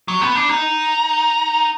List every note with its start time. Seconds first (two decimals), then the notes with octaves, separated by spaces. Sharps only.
0.08 F#3
0.21 B3
0.35 D4
0.49 D#4